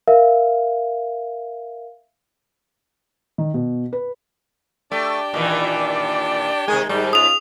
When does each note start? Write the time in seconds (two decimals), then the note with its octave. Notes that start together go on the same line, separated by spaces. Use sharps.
0.08 A#4 E5 F5
3.38 D#3
3.54 B2
3.93 B4
4.92 A3 D4 G4 D5
5.34 A#2 D#3 E3
6.68 C3 D#3 G#3 G#4
6.89 G#2 D#3 G3
7.13 C#4 F4 D#6 F7